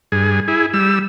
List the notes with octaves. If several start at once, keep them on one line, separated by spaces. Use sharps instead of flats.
G2 G#4
E4 G#4
G3 E6